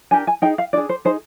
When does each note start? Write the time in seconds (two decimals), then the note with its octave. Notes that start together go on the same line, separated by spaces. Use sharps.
0.11 D4 G4 A#4 G#5
0.27 G#5
0.42 D#4 G#4 G5
0.58 F5
0.73 D4 G#4 D5
0.89 C5
1.05 D#4 G#4 C5